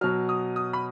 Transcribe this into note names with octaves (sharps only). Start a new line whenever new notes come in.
B2 F#3 F6
D#6
D#6
B5